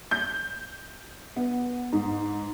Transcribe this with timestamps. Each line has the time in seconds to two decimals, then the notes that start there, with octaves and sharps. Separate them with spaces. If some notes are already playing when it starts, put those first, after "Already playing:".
0.11 G6
1.36 B3
1.92 G#2